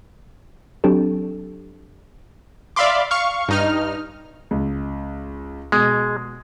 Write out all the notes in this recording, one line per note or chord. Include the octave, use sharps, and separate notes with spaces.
F#3 C4 D4 G4 A4
D5 E5 F5 B5 C6 D6
F5 C#6
G2 D#4 F6
C#2
B2 G#3